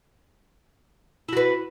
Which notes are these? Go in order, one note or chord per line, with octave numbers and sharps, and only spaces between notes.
E4 F#4 B4